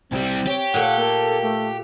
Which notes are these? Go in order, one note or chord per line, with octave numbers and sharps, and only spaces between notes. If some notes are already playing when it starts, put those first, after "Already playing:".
C2 G3 C4
G4 C#5
A#2 A3 F#5
A#3 A4
A3